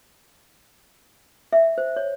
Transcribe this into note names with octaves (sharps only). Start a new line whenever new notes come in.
E5
C5
C#5